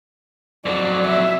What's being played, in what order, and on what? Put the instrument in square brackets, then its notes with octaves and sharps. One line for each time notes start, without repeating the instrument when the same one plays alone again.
[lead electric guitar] F2 F#3 [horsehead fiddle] D5
[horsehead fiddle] E5